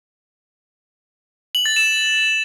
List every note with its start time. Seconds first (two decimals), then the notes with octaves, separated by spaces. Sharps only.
1.55 F#7
1.66 A6
1.76 E7